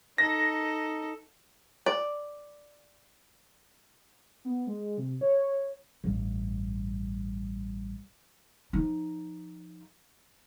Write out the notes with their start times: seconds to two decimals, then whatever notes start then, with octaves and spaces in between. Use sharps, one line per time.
0.18 D#4 A4 A#6
1.86 D5
4.45 B3
4.67 G#3
4.98 C3
5.21 C#5
6.04 A1 G2
8.73 F3 D#4